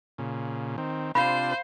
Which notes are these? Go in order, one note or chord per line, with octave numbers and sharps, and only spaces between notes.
A#2 C#3
D#3 C4
C3 D4 F4 C5 F5 B5